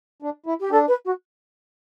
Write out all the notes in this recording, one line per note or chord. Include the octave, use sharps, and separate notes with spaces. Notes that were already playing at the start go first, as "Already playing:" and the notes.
D4
E4
G4
D4 A4
B4
F#4